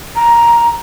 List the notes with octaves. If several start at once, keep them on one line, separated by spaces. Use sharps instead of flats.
A#5